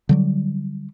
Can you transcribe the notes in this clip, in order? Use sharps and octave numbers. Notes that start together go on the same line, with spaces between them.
D3 F#3 G3